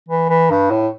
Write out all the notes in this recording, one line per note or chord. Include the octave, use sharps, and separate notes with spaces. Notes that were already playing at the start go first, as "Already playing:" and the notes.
E3
E3
G2
A2